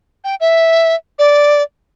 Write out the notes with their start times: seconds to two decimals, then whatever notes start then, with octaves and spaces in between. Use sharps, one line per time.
0.24 G5
0.40 E5
1.19 D5